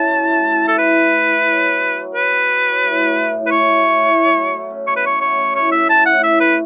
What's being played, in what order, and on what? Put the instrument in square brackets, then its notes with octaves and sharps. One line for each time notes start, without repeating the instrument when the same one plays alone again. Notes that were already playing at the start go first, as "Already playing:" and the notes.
Already playing: [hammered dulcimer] F#3 C#4 E4 [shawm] A5
[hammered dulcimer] E3
A3
E4
E3
[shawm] A4
[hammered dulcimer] E3 [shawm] B4
[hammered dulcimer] A3
E4
E3
F#3
B3
F#4
F#3
[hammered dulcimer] F#3 [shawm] B4
[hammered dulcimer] B3
F#4
F#3
A2
F#3
A3
A2
[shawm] B4
[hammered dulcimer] A2 [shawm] C#5
[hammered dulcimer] F#3
A3
A2
B2
F#3
A3
C#4
[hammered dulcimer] B2 [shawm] C#5
[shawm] B4
[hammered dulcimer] F#3 [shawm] C#5
[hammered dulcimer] A3 [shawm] C#5
[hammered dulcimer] C#4
[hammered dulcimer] A2 [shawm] C#5
[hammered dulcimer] A3 [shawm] E5
[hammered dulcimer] E4 [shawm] A5
[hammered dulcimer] A2 [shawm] F#5
[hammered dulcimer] A2 [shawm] E5
[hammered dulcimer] A3 [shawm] B4